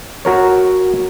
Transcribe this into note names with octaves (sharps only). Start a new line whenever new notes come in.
F#4 A#4 C#5